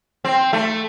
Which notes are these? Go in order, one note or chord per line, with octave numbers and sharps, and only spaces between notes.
C4
A3